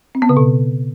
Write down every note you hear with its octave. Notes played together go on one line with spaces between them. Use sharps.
C4
B3
C#3
B2